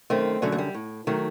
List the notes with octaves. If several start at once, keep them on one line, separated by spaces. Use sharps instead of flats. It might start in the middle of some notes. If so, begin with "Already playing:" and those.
F#2 D#3 A3 C4
F#2 D3 F#3 A3
A3
G3
A2
D#3 F#3 A3